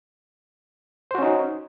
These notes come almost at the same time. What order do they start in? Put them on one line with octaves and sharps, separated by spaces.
C5 F#4 C#4 D#4